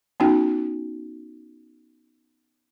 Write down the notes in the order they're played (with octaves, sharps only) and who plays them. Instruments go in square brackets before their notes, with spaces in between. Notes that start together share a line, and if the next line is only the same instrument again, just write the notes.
[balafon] B3 C#4 D#4 F#4 G5